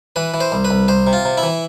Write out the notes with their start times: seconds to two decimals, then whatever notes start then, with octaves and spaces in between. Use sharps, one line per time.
0.16 E3 B4
0.34 E3
0.40 C5
0.52 C2
0.65 B4
0.71 C2
0.88 C2 C5
1.07 C3
1.13 F4
1.25 C3
1.38 E4
1.43 E3